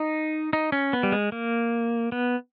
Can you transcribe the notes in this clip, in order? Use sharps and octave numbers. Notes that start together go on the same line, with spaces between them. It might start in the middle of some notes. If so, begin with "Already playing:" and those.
Already playing: D#4
D#4
C#4
B3
G3
G#3
A#3
B3